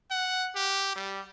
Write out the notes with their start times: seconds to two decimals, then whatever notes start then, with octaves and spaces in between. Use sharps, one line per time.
0.11 F#5
0.55 G4
0.96 G3